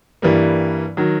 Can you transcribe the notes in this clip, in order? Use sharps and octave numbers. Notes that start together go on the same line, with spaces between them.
G2 E3 G3 A#3
D#3 F#3